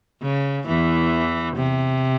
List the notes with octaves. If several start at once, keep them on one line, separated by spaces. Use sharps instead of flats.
C#3
E2 E3
C3